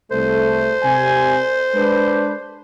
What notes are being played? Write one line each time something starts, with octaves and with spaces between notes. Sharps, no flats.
C2 A3 A4 C5
C3 G#5
G#3 D4 B4